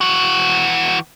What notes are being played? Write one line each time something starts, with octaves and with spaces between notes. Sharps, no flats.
E3 F#4